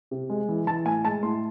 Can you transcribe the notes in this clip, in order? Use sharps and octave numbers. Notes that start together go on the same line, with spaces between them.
C3
G#3
E3
E3 A5
A2 G#5
G#3 A5
A2 C6